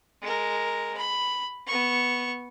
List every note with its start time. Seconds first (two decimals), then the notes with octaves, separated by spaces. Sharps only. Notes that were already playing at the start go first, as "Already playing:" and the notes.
0.22 G#3 A#4
0.97 B5
1.67 B3 C#6